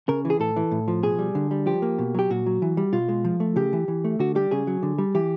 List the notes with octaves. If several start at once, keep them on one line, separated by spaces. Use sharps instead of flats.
C#3 A#4
E3
G#4
A2 A4
E3
A2
F3
B2 G#4
G3
D3
G3
F3 G4
A#3
B2
F#3 G4
A#2 F#4
F#3
E3
G3
B2 F4
G#3
F3
A3
C#3 G4
E3
E3
A3
D3 F#4
G3 G4
C#3 G#4
F#3
D3
G3
E3 G4